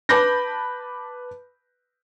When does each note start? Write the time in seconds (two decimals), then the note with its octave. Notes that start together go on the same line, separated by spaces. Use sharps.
0.09 B4 A5 B5 D6 G6 A#6